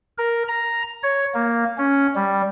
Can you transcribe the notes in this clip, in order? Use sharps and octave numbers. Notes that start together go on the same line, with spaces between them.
A#4
A#5
C#5
A#3
C#4
G3